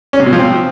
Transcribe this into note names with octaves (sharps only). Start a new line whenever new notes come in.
C#4
C3
B2
F3
C4